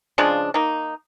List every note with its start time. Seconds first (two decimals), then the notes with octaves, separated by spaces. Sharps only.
0.18 C#3 F3 G#3 D4
0.54 A#3 D#4